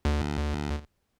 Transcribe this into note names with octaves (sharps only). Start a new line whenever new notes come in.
D2